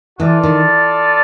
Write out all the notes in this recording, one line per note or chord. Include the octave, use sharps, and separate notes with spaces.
E3 F4 A4 D5
D#3